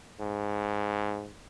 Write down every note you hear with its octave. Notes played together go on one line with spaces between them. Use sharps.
G#2